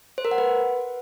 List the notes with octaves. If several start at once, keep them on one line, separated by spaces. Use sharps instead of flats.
C5
A#4
F#5
B4